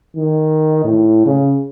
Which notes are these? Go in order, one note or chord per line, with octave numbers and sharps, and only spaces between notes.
D#3
A2
C#3